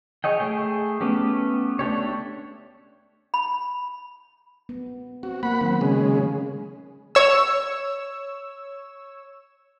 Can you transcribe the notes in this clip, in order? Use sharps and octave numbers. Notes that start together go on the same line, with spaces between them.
G#4 C#5 D#5 G5
A3 G#4 G5
A3 B3 C#4 G4
A3 D4 G4 C#5
B5
B3
C4 F#4
A#3 F#5 B5
D#3 F#3 C4
C#3 G#3
C#5 E6